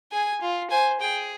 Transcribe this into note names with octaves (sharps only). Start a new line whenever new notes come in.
G#4 G#5
F4
C5 G#5
G#4 G5